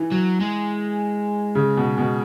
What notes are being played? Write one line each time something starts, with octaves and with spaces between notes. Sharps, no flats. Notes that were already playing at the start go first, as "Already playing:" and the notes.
Already playing: E3
F#3
G#3
C#3
B2
B2